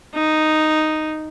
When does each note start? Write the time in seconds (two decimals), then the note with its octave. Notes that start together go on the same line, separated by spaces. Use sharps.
0.15 D#4